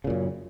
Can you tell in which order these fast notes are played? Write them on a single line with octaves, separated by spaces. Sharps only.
C#3 A#2 F#2